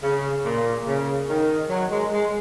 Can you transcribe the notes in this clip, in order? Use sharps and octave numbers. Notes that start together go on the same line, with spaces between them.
C#3
A#2
C#3
D#3
F#3
G#3
G#3